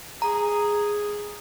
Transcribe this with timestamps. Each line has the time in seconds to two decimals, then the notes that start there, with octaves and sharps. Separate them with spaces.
0.22 G#4 A#5